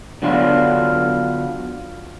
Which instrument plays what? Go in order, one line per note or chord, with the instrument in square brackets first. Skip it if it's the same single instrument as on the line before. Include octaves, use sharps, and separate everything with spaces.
[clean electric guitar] D3 F#3 B3 D4 F4